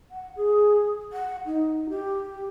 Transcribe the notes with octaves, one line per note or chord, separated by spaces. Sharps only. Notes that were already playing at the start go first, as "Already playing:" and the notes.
F#5
G#4
F#5
D#4
G4